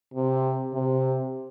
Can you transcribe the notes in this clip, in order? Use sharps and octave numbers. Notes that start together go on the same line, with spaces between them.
C3
C3